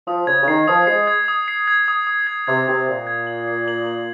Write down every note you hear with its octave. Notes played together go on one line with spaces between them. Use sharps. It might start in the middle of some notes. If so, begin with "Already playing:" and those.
F3 D#6
C#3 G#6
C#3
D#3 C7
F3 D#6
G#3 C7
G#6
D#6
C7
G#6
D#6
D#6
G#6
C3 G#6
C3 G#6
A#2 G#6
G#6
F#7
C7
F#7
F#7